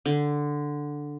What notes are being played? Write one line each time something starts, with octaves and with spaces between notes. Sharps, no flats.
D3